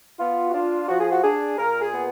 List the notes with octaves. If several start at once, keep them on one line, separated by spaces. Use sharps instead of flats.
B3 F4
F#4
D4 F4
F3 F#4
G#4
F#4
D4 G#4
A#2 A#4
G#4
B3